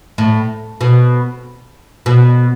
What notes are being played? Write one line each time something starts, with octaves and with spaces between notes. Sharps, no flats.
A2
B2
B2